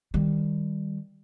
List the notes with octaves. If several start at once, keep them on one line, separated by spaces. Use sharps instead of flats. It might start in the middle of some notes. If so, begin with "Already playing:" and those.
D#3 G3